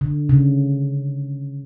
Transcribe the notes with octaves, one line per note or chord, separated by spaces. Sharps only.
D3
C#3